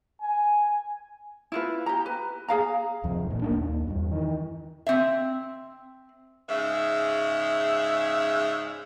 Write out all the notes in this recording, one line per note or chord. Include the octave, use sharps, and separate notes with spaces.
G#5
E4 F4 B4
G4 A#5
B4
G#4 F5 A#5
D1 F2 C3
A1 A#2
C2 A#3 D4
D#2
E2 G2
D#3 E3
C4 E5
G#2 C#3 E5